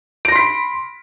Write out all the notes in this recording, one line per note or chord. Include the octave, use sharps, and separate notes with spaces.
B5 C6 A#6 B6 D7